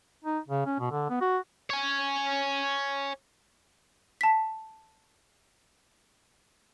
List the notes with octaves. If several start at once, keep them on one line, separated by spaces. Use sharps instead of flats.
D#4
C#3
C#4
B2
D3
B3
F#4
C#5 G#5
A5 B6